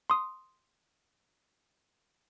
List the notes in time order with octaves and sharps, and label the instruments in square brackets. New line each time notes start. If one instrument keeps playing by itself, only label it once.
[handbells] C6 D#6